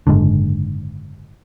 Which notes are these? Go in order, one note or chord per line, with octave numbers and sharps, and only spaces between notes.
F#1 G#2 D3